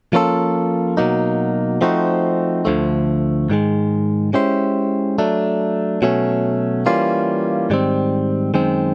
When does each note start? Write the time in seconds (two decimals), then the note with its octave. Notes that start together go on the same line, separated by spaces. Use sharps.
0.13 F3 A#3 C#4 F4 A4
0.97 B2 F#3 A#3 D#4
1.81 F3 A3 C4 D#4 F#4
2.65 D2 D3 F3 A3
3.50 G#2 D#3 G#3
4.33 G#3 C#4 E4 G4 C5
5.18 F#3 A3 D4
6.02 B2 F#3 A3 C#4
6.86 E3 G3 A#3 C#4 F4
7.70 G#2 D#3 G3 C4
8.54 F#2 D#3 G#3 C4